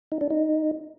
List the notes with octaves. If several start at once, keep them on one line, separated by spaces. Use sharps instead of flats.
D#4
D4
D#4